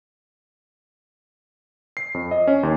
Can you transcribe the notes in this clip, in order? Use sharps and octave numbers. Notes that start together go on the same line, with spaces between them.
C7
F2
D#5
C#4
D#2